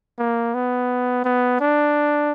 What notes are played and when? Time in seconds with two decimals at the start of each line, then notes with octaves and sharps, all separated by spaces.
0.18 A#3
0.54 B3
1.25 B3
1.60 D4